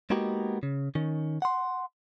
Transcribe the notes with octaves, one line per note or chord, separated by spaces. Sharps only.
G#3 A#3 B3 D#4 F#4 G4
C#3
D#3 C#4
F#5 C6